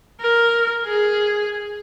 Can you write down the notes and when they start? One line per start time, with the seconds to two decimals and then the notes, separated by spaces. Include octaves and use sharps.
0.20 A#4
0.85 G#4